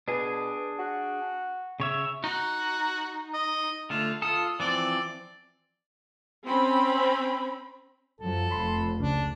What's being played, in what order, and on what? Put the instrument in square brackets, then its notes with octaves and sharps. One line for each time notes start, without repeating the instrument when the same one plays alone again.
[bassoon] B2 [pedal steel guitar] D4 G#4
[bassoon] F#4
[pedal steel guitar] C#3 C#5 E5
[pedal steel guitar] D#4 [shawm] F#4
[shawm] D#5
[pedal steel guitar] D3 A3 [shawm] F4
[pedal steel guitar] F4 A4 [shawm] D#6
[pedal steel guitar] E3 F3 C4 [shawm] D5
[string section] C4 C#4 B5
[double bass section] F#2 F3 F#3 [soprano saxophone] A4
[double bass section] F1 F2 [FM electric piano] B5 C6
[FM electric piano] C#2 C#3 [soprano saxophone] D4